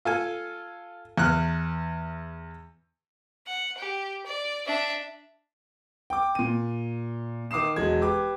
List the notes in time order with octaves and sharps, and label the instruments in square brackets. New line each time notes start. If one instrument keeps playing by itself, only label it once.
[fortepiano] F4 A4 G#5
E2 F6 F#6
[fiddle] F#5
G4
D5
D4 E5
[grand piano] G5 D6
A#2 D#7
D#3 D6 D#6 C7 E7
E1 F#3 G#3 G#6
G4 B4 D6